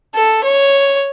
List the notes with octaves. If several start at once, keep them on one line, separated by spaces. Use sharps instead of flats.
A4
C#5